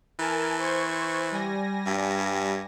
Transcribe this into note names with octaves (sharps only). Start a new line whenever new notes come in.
E3 A#4 G#5 A5
C5 C#6 G#6
G3 G#5 A#6
G2